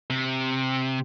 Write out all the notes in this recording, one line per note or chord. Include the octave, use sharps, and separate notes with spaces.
C3